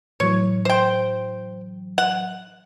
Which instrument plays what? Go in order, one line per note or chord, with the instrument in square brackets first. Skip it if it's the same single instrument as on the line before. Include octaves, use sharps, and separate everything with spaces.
[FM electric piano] A2 E3 F#3 [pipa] C#5
[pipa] C5 G5
F#5